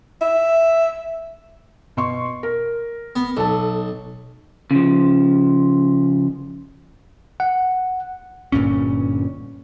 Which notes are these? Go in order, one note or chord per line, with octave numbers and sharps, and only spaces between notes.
E5
B2 C6 C#6
A#4
B3
B1 A4 A5
C#3 F3
F#5
G1 G2 A#2 C#4